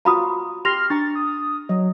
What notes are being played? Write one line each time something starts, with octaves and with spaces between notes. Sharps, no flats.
F4 F#4 F5 A#5 B5 D#6
G4 C6 F6 A#6 F7
D4 A#5 C#6 A6
D#6
F#3 D#5